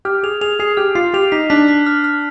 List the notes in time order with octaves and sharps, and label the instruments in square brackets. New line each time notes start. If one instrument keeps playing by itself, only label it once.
[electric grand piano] G4 [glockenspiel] F6
[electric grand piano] G#4 [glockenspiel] F7
[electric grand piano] G#4 [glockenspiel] F7
[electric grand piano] G#4 [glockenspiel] C7
[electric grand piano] G4 [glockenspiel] F6
[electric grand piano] F4 [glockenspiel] C7
[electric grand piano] G4 [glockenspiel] F7
[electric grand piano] D#4 [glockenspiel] B6
[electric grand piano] D4 [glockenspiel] B6
[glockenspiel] B6
F6
F6